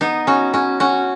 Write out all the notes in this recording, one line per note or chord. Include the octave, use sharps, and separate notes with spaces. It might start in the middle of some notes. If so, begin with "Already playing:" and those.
B3 D#4
C#4 F#4
C#4 F#4
C#4 F#4